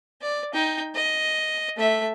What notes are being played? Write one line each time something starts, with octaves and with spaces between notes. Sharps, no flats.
D5
D#4 G5
D#5
A3 E5